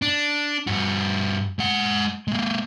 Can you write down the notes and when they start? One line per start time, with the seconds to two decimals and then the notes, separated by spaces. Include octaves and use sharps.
0.02 D4
0.67 G2 F#4
1.59 G#3 F#5
2.28 G#3 A#3